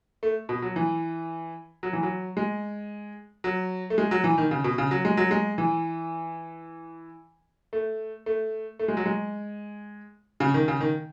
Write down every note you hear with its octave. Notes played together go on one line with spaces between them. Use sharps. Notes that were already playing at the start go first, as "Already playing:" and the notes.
A3
B2
F#3
E3
F#3
E3
F#3
G#3
F#3
A3
G#3
F#3
E3
D#3
C#3
B2
C#3
F#3
G#3
F#3
G#3
E3
A3
A3
A3
G#3
F#3
G#3
C#3
D#3
C#3
D#3